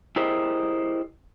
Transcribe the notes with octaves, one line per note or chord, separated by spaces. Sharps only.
E4 G4 G#4 A#4 C5 D#5